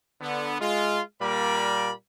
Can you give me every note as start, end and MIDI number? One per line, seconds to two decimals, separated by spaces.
0.21 0.56 50
0.21 0.56 59
0.60 1.00 56
0.60 1.00 65
1.20 1.91 46
1.20 1.91 55
1.20 1.91 58
1.20 1.91 70
1.20 1.91 74
1.20 1.91 83